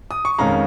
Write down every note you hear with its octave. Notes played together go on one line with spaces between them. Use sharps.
D#6
C#6
F2 D#3 G#3 C#4 F5 A#5